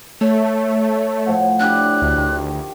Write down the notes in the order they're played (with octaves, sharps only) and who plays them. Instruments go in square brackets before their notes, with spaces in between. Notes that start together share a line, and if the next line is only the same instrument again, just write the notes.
[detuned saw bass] A3 [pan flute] C#5
[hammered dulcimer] A2 F3 F#5
[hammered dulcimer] D4 E4 G4 [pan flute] F#6
[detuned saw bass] D2
[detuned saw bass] D2 [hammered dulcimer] D#3